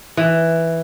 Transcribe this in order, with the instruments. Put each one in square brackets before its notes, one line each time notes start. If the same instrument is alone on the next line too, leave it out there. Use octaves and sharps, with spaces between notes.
[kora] E3